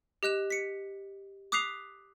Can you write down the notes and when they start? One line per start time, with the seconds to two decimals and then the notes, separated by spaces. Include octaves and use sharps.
0.23 G4 D#5 F#6 E7
0.50 B6 C#7
1.52 D6 D#6 F#6 B6 C7 F7